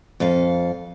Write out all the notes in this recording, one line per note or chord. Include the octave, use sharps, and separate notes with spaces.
F2 A4 F5